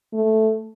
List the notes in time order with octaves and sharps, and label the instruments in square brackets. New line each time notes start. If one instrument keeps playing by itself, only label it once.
[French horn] A3